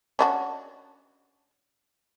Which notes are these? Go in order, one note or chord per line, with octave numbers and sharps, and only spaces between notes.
C#4 D4 F#4